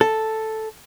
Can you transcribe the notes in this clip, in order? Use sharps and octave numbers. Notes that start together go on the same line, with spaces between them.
A4